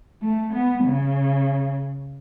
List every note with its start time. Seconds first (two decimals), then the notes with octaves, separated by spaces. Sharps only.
0.22 A3
0.54 B3
0.85 C#3